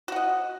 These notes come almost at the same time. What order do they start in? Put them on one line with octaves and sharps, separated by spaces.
F#4 F#5 D#5